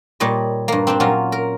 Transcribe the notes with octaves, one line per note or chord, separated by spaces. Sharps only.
A#2 G3 C#5 D#5
G2 A#3
C4 D4 G4
A#2 F#3 C#4 F4
A#4